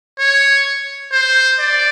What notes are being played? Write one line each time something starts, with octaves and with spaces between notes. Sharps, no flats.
C#5
C5
D5